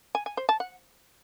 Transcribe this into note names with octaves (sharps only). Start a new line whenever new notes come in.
G#5
G#5
C5
A5
F#5